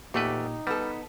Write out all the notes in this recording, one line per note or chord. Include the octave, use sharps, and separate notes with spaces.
E2 A#2 A3 D#4 G4 B4
G3 B3 A4 B4